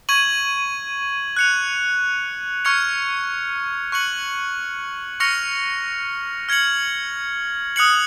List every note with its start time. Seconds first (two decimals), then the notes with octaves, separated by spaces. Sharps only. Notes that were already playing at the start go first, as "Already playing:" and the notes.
0.09 C#6 G#6 D#7 F#7
1.37 F#6 C#7 F7
2.65 C#6 F6 G#6 C#7 F7
3.92 C#6 F#6 C#7 F#7
5.20 C#6 F6 A#6 C#7 F7
6.49 F6 G#6 C#7 F#7
7.76 D#6 F#6 C#7 F#7